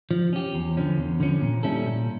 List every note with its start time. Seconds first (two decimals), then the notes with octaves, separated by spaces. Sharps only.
0.11 F3
0.33 C#4 G4
0.55 E2
0.77 D3 F3 C#4
0.98 E2
1.20 D3 F3 C#4
1.42 A#2
1.63 G3 C#4 E4 A4
1.85 A#2